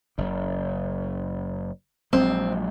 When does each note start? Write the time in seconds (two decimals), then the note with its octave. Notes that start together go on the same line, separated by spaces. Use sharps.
0.18 F#1 C#3
2.13 A#1 F#3 G#3 C4